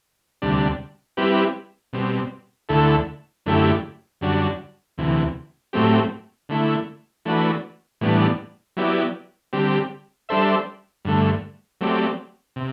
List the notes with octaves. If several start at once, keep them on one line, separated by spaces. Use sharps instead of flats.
D2 C3 G3 D4
G3 C4 E4 G4 B4
B2 G3 C4
D2 D3 A3 E4 A4
F#2 D3 A3 E4 G4
F#2 D3 G3 D4 F#4
D2 C3 E3
A2 F#3 A3 C4 G4
D3 A3 E4
E3 A3 D4 F#4 B4
A2 E3 G3 B3 D4
F#3 B3 E4 G4 D5
D3 G3 C4 G4
G3 D4 A4 C5 E5
G2 D3 A3
F#3 A3 C4 G4 D5
C3